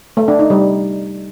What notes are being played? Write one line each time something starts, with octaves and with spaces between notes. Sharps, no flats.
A3
D4
D#4
G3